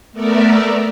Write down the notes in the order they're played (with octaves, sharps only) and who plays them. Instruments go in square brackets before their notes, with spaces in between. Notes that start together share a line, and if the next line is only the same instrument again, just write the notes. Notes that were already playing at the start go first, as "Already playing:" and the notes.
[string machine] A3 B3 A4 A#4 D5 E5